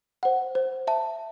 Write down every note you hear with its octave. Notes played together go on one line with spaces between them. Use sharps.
C5 F#5
C5
E5 A5